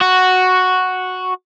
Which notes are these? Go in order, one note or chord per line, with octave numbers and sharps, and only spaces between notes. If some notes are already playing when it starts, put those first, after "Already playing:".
F#4